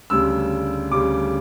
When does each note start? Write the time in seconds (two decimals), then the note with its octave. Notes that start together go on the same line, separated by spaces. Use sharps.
0.10 D2 C#3 G3 E6
0.91 D2 C#3 G3 D6